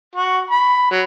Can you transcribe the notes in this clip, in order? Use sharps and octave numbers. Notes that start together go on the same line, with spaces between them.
F#4
B5
F#3